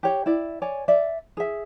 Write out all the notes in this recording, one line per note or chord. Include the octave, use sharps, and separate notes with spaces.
G4 C#5 G5
E4 D5
C#5 D5 G#5
D5 E5
G#4 E5